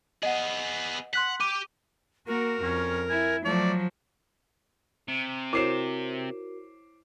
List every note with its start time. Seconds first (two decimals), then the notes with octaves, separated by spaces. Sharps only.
0.23 B3 G#4 D#5 F#5
1.13 F#5 C6 F#6 B6
1.40 G4 D6 D#7
2.27 A#3 F#4 A#4
2.63 F2 C#4
3.09 E4 G#5
3.45 F3 F#3 A3 D5
5.08 C3
5.53 E4 F#4 A#4 C5 C#5 D6 C7 E7